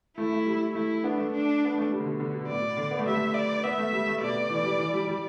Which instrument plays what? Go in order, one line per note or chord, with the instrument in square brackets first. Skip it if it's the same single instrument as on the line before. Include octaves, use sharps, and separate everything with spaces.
[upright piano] A3 [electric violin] E4
[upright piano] A3
G3
[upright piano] A3 [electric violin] E4
[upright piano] B3 [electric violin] D4
[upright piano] A3
[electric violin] D4
[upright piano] B3
A3
G3
D3
B2
D3
B2
[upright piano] A2 [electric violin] D5
[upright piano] B2
D3
B3
A3
[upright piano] G3 [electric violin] E5
[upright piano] A3
[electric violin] D5
[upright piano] B3 [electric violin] E5
[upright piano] A3
G3
A3
[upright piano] B2 [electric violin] D5
[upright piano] B2
E3
G3
E3
G3
G3